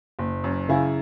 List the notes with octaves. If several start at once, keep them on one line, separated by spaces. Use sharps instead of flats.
F#1
F#2
C#3 E4